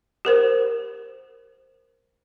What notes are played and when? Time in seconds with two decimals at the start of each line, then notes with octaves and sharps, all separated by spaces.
0.25 G4 A#4 C5